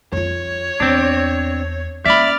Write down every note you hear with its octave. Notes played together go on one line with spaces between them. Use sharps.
F2 F4 C#5
E2 C4 D4
A#3 C#4 D5 E5 B5 F6